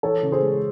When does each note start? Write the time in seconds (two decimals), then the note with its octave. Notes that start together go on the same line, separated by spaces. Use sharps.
0.03 E3 A4 C#5
0.23 C#3
0.32 G#4 C5
0.42 G#3